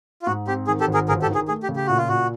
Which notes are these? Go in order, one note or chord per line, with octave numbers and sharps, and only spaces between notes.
F4
G#2 F#4
C4 G4
D#3 G#4
G4 A4
G#1
G#4 A#4
G1 G#4 A#4
G4 A4
D#3
G#4
A3 G#4
G4
C#3
G4
A#2 F#4
F4
A#2 F#4